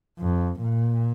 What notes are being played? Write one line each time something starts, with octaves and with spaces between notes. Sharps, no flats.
F2
A#2